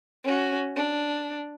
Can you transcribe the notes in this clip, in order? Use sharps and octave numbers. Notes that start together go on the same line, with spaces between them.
C#4 F#4
D4